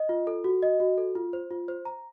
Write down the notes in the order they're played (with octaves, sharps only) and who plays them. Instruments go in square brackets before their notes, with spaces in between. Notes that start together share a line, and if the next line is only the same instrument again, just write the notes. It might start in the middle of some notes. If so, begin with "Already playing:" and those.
Already playing: [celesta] D#5
F4
A4
F#4
D#5
F#4
A4
F4
C5
F4
C5
A#5